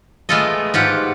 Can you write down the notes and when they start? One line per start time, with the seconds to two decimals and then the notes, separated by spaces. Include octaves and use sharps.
0.29 G#3 A3 B3 F4 A4 D#5
0.74 G#2 F4 G4 F#5